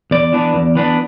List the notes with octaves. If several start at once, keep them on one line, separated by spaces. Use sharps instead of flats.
E2 D5
E3 B3 D4
E2
E3 B3 D4